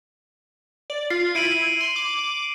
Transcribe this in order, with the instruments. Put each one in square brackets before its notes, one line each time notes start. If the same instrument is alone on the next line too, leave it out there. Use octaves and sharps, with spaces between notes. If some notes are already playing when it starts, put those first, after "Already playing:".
[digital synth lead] D5
[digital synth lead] F4 [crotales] C7
[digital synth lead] E4 [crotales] D7 D#7 F#7
[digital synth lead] C6
D6